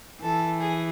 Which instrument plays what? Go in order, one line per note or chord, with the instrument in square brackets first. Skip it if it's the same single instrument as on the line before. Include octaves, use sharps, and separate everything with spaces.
[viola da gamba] E3 [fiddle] A4
[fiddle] G#4